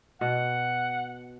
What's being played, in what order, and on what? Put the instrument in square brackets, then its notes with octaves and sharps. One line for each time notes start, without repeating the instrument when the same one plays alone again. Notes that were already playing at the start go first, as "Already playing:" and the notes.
[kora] B2 [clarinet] F#5